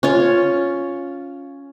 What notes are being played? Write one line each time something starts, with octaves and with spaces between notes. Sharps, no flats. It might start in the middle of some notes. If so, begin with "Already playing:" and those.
C#4 F4 C#5